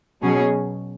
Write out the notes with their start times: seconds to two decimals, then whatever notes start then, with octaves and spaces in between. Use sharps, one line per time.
0.21 B2 F#3 C#4 G#4